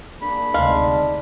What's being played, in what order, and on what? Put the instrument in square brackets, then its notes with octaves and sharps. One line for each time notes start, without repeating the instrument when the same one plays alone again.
[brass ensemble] A#3 D4 G#4 [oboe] B5
[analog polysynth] D2 C3 [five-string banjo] G#3 F5 [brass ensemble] D#4 D5 A5